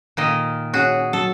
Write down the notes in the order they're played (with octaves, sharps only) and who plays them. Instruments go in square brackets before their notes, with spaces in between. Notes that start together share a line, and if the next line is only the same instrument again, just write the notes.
[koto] A#2 D#3 D#5
[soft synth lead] C#4 [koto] F#4 G#4
[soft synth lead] F#3 [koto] A4